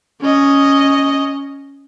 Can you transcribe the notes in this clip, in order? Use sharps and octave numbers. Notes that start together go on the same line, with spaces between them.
C#4 D#5